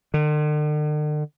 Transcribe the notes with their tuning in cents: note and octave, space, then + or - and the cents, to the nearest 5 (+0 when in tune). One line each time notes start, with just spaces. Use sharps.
D3 +45